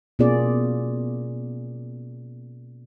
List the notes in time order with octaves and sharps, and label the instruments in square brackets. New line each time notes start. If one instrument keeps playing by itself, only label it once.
[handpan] B2 A#3 C#4 F4 G#4 D5